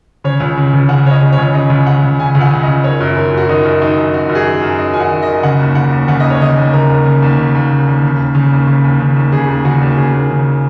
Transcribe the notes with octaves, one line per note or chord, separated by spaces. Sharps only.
C#3 C#5
C#2
C#3
C#2
C#3 F#5
C#2 C#5
D#5
C#3
C#5
C#2
C#3 D#5
C#2
C#3 F#5
C#2
C#3 G#5
C#2
F#5
C#3
C#2 D#5
D#3 C#5
F#2
D#3 A#4
F#2 F#4
D#3 D#4
F#2
D#3 D#4
F#2
D#3 F#4
F#2
G#4
D#3
F#2
D#3 D#5
F#2 G#5
F#5
D#3
D#5
F#2
C#3 F#5
D#2
C#3 F#5
D#2
C#3 F#5
D#2 D#5
C#5
C#3 D#5
D#2
C#3 A#4
D#2
C#3
D#2
C#3
D#2
C#3
D#2
C#3
D#2
C#3
D#2
C#3
D#2
C#3
D#2
C#3 G#4
D#2
C#3 F#4
D#2
C#3 G#4
D#2
C#3